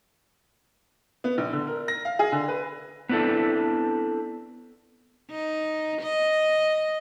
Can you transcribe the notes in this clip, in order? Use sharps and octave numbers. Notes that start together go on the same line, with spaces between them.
B3
A#1
D3
A#4
A#6
F5
G#4
D3
B4
B3 C4 D4 E4 A4
D#4
D#5